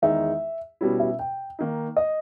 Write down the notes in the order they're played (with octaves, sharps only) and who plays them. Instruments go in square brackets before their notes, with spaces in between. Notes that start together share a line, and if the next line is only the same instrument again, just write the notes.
[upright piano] E2 D#3 G#3 D#4 [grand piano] E5
[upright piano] B2 G3 C#4 E4
[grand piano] E5
G5
[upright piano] D#3 A#3 D#4
[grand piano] D#5